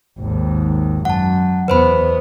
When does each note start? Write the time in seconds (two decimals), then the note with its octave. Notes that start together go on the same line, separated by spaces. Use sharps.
0.19 G#1 D#2
1.05 F#2 F#5 A5
1.68 E2 B3 B4 C5 B5